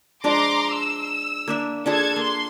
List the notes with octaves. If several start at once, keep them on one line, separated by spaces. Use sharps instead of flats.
F3 G#3 D4 A#5 C6 D6
E6
A#3 D4 E5
D4 F4 G#4 A4 A5 G#6
A#3 C6